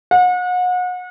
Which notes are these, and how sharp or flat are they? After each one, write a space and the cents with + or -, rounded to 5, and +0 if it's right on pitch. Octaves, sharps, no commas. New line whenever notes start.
F#5 -35